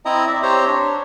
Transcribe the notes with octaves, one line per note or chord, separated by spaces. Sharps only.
C4 E4 D#5 A#5
D5 E5
C4 G4 C5 C#5 A#5
D4 C#5